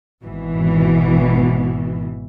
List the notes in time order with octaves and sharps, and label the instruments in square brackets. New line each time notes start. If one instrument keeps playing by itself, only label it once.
[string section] G#1 B2 E3